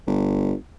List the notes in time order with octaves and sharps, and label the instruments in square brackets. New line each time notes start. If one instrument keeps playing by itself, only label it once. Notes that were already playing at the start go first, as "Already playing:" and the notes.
[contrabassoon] G1